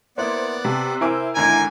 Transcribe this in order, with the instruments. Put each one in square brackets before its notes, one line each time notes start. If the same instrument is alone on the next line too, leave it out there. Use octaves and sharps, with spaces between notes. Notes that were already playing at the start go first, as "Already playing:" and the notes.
[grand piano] A#3 E4 [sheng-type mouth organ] B3 D5 F#5 [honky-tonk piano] C5
[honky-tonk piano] C3 [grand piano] A5
[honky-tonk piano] E4 E6 [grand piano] A#4 G#5 D6 [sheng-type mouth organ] C5
[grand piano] G#1 D3 A#5 [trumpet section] A#4 G#5 [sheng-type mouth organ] D6